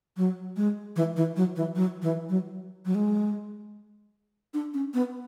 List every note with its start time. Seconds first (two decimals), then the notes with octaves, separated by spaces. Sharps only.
0.17 F#3
0.57 G#3
0.96 E3
1.16 E3
1.36 F#3
1.56 E3
1.76 F#3
2.02 E3
2.29 F#3
2.86 F#3
2.95 G#3
4.54 D4
4.74 C#4
4.94 B3